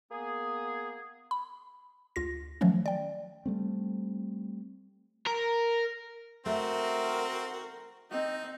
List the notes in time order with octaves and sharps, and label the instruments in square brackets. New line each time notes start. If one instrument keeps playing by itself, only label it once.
[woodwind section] A#3 B3 G#4
[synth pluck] B5
D2 F4 A#6
D#3 F3 F#3 A3 C#4
D5 G5
[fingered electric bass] G3 A3 C4
[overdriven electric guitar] A#4
[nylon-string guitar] A3 [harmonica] C4 F#4 [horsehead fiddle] A#4
[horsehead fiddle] C4 [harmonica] D#4 [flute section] D#5